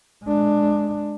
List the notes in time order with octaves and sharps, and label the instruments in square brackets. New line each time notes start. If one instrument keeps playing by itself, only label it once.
[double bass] G#3 D4